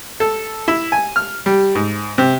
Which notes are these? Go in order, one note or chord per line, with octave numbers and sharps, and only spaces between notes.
A4
E4
G#5
F6
G3
G#2
C3